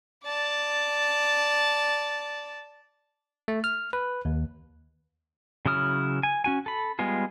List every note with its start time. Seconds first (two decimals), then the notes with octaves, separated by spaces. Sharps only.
0.24 D5 A5
3.48 A3
3.64 F6
3.93 B4
4.25 D#2
5.66 C#3 F#3 E4 D#6 F6
6.23 G#5
6.44 C#4 F#4 G#5
6.66 A4 B5
6.99 G3 G#3 B3 F4 G#4